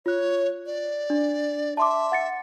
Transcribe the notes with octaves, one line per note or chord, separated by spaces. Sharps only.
F4 C#5 F#6
D5
D4
E5 A5 C6 D6
F#5 A6 C#7